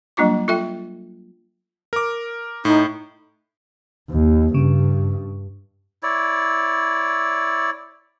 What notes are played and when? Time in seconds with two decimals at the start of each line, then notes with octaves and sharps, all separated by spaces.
0.17 F#3 G3 A#3 D4 F4 D6
0.48 F4 A4 E5 G5
1.93 A#4 D6
2.65 A2 D#4
4.10 D#2
4.54 G2 C#3
6.03 E4 C#5 D5